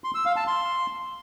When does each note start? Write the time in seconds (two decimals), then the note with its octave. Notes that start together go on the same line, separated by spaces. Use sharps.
0.04 C6
0.15 E6
0.26 F5
0.36 A5
0.47 C6